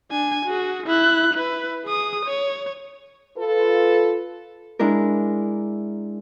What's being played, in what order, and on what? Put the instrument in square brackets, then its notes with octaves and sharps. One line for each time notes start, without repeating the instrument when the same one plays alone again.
[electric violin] D4 G#5
F#4 G#4
E4 F#6
E4 B4
G#4 D#6
C#5
[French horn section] F4 A4 B4
[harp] G#3 D4 E4 A#4